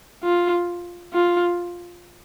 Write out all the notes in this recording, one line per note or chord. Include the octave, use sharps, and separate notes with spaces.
F4
F4